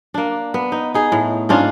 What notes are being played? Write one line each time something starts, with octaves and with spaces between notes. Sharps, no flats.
A#3 D4
B3
D#4
D#4 G#4
A2
G#2 C#4 D4 F4